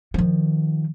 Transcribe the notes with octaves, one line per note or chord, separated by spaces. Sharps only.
D#3 F3